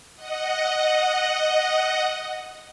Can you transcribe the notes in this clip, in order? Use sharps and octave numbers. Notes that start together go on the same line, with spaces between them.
D#5 F#5